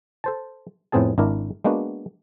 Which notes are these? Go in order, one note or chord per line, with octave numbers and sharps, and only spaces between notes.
A4 C5 A5
F2 A2 B3 C4 G#4 A5
G#1 D4 E4 A#4
G#3 A#3 B3 D4 F#4